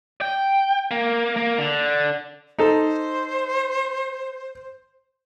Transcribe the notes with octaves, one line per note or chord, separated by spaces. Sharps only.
G5
A#3
A#3
D3
D#4 A4 C5